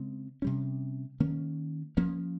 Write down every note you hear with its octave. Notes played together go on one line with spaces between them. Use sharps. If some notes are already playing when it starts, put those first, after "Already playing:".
Already playing: C#3 G#3 C4
C3 G3 C#4
D#3 A#3 C#4
F3 A#3 C#4